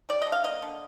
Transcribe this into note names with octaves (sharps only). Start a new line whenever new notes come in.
G3 D5
D#5
D3
F5
A#3 D#5
D3